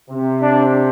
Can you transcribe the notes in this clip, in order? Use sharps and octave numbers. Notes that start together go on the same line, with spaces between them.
C3
D4